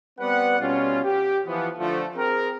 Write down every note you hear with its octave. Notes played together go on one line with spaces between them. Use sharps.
G3 B3 C4 B4 D5 F#5
B2 G3 C#4 F4
G4
E3 F3 B3
D3 F3 A3
C4 G#4 A#4